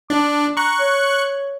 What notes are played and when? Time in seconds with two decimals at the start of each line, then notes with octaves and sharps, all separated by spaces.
0.10 D4 D6
0.57 A#5 C#6 F#6
0.80 C#5